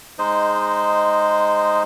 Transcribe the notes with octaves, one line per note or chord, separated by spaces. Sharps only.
G#3 D#4 C5 D#5